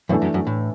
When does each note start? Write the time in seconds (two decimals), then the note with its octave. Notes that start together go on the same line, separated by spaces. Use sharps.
0.09 F#2 B2 E3 A3 D4 A4
0.22 F#2
0.34 F#2
0.47 A2